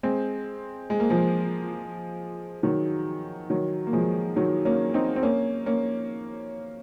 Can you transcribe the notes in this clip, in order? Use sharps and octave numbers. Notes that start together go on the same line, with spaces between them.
G#3 C4
G#3
A#3
F3 G#3
D#3 F#3
D#3 F#3
A#3
F3 G#3
D#3 F#3
A#3 C#4
C4 D#4
C4
A#3 C#4
A#3 C#4